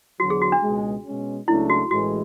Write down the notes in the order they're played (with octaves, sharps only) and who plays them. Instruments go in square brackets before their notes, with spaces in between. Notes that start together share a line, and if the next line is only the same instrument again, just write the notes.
[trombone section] E2 D3 F#3 [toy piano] F#4
[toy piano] G#4
F#4
D4
[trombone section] C#2 B2 G#3
B2 G#3 C#4
[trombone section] C#2 C#3 F#3 A3 D4 [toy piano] E4
[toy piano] F#4
[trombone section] A1 A2 E3 G#3 [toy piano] F#4